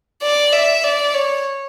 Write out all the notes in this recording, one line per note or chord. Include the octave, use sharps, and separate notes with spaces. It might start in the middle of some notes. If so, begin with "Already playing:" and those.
D5
E5
D5
C#5